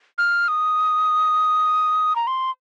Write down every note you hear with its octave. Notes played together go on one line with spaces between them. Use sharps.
F6
D#6
A#5
C6